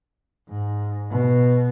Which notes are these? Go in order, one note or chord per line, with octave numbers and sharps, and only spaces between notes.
G#2
B2